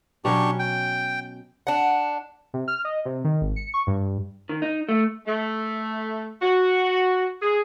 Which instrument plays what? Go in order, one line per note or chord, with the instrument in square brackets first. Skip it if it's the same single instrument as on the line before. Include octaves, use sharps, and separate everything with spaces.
[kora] B2 F#3 C#4 [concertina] D4 G4 C#6
[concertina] G5
[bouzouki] D4 F#5
[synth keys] C3
F6
D#5
C3
D#3
G#1
C#7
C#6
G2
[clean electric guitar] D#3
D#4
A3
[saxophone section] A3
F#4
G#4